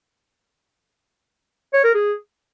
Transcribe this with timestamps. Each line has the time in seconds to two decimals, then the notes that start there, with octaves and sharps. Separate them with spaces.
1.74 C#5
1.84 A#4
1.95 G#4